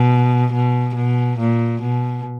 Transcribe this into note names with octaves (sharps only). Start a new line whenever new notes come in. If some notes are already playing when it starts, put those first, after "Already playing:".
Already playing: B2
B2
B2
A#2
B2